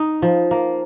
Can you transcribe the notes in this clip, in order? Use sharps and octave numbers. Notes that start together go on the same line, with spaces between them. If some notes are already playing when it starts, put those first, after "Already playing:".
Already playing: D#4
F3
A#3